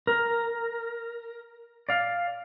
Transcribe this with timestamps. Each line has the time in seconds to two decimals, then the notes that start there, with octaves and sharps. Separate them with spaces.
0.07 A#4
1.89 D5 F5